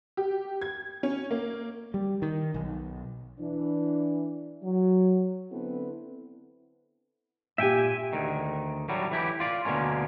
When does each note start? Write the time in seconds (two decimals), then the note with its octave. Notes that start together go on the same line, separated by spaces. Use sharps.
0.17 G4
0.62 G#6
1.03 C#4
1.31 A#3
1.94 G3
2.22 D#3
2.54 B1
3.39 E3 D4
4.62 F#3
5.51 D3 B3 C4 E4 A4 B4
7.58 A#2 G4 E5 G5 G#5
8.13 D2 D#3
8.89 A2 F#3 G3
9.12 E3 E4 G4
9.40 F4 D5
9.65 D2 B2 D3 A#3 C#4